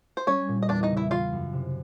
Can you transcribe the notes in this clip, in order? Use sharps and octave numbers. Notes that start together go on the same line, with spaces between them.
C5
G3 C#4 C#5
A#2
D#5
E2 D4 D5
D#4 D#5
C#3
E4 E5
E3 F4 F5
F#2
C3